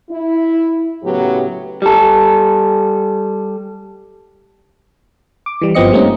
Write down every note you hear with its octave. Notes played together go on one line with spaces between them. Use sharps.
E4
A2 C#3 F#3 B3 G4
G3 A4
D6
E3 G3
G1 F3 B3 C4 D#5 C#7
G3 A3 A#3 C4 C#4 D#4